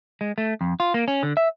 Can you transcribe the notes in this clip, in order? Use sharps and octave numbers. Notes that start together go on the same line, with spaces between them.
G#3
A3
F2
F4
A#3
C#4
D3
E5